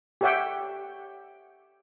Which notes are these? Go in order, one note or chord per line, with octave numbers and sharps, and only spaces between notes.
G4 A4 C#5 E5 F#5 G5